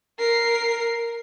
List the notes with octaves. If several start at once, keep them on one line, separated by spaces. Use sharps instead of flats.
A#4 C7